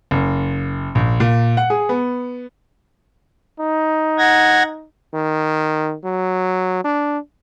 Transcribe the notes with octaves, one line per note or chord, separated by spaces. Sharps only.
F#1
A#1
A#2
F#5
G#4
B3
D#4
F#5 G#6 A#6
D#3
F#3
D4